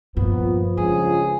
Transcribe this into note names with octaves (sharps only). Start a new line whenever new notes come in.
G2 A#2 F3 A#3 B3
C#2 G2 D#4 G#4